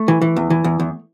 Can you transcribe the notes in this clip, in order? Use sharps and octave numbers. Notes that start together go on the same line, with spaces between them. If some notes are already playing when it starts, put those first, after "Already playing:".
Already playing: A3
E3
E3
E2
E3
E2
E2